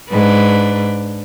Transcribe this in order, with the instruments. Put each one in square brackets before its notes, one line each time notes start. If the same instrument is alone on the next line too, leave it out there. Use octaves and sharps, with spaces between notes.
[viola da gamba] G#2 D4 B4